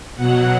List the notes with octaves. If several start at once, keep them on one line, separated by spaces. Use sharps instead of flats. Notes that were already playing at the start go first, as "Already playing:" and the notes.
B2 F#3 F#5